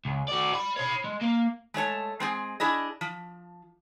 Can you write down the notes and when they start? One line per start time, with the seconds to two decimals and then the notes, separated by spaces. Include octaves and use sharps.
0.05 C#2
0.28 F#4 D5
0.54 D5 B5
0.77 C#5 B5
1.04 G#3
1.21 A#3
1.74 G#3 A3 C#5 A5
2.20 G#3 C4 G#4
2.60 D4 E4 G#4 D#5
3.01 F3